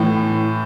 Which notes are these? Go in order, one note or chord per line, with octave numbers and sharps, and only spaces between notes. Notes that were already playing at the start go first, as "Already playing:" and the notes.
Already playing: A2 E3